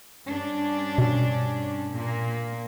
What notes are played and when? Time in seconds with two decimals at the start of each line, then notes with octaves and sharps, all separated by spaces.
0.27 G2 C#4 D4
0.98 B2
1.92 A#2 A#3